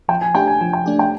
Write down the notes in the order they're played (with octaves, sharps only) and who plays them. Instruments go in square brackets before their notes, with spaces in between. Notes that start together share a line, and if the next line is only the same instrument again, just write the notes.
[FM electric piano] F3 [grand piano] G5
[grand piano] G#5
[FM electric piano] A3 D4 G4 [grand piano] G5
[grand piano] G#5
[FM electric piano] F3 [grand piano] G#5
[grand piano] G5
[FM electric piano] A3 D4 G4
[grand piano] G5